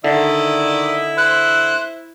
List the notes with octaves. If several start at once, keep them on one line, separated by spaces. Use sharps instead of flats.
D3 D#3 E4 D5 D#5
C5 F#6